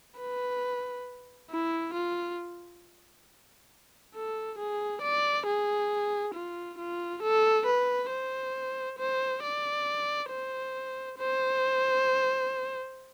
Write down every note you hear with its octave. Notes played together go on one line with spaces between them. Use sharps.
B4
E4
F4
A4
G#4
D5
G#4
F4
F4
A4
B4
C5
C5
D5
C5
C5